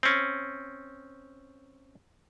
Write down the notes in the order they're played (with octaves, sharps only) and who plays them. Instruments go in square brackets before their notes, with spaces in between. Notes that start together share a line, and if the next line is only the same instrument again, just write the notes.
[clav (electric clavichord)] C4 C#4